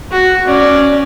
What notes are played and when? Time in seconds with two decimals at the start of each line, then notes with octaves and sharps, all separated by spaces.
0.11 F#4
0.47 C#4 D5